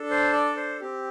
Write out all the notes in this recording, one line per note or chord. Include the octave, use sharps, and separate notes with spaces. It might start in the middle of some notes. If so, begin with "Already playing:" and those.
Already playing: D4 A4
C5
D5
C5
C4 G4